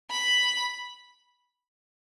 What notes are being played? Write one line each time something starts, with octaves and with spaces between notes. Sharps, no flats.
B5